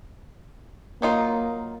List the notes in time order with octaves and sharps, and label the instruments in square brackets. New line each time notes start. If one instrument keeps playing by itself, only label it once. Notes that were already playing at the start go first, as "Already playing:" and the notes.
[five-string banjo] F#3 D#4 F4 [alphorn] A#3